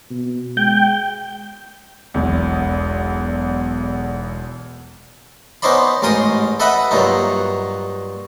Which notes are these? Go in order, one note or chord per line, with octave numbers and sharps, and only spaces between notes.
B2
G#3 G5
E1 B1 E2
B3 C#4 D#4 C5 D5 B5
A1 G#2 A#4 G5 D#6
A4 B4 D#5 E5 F#5 B5
G2 A#2 F#3 D#4